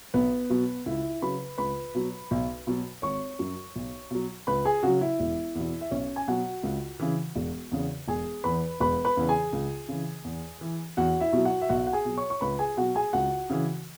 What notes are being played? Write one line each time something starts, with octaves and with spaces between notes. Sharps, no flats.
B1 B3 B4
B2 F#3
C#2 E4 E5
C#3 F#3 B4 B5
C#2 B4 B5
B2 F#3
B1
B2 F#3
G#1 C#5 C#6
F#2 F#3
B1
B2 F#3
C#2 B4 B5
G#4 G#5
C#3 F#3 F#4 F#5
E4 E5
E1
E2 B2
E5
B1 C#4 C#5
G#5
B2 F#3 F#4 F#5
C#2
C#3 E3
E1
E2 C#3
E1 G#4 G#5
E2 E3 B4 B5
E1 B4 B5
B4 B5
E2 C#3 E3
G#4 G#5
C#2
C#3 E3
E2
E3
E2 F#4 F#5
E4 E5
B2 F#3
F#4 F#5
E5
B1 F#4 F#5
F#5
G#4 G#5
B2 F#3
C#5 C#6
C#6
C#2 B4 B5
G#4 G#5
B2 F#3 F#4 F#5
G#4 G#5
C#2 F#4 F#5
C#3 E3